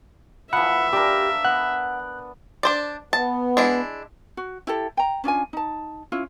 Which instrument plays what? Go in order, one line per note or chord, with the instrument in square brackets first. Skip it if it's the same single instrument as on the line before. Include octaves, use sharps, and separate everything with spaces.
[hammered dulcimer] E3 F3 [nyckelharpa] E5 [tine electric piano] F#5 [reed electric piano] B5
[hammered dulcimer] D4 A#4 [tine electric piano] G4
[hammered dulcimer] B3 [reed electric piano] F#5 [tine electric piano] F#6
[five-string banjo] D4 C5 D5
[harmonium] B3 [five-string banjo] A5
[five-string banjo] G#3 D4 E4
[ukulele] F#4
E4 G4 A4
G5 A#5
C#4 D4 F4 G#5
D#4 A5
C#4 E4 F4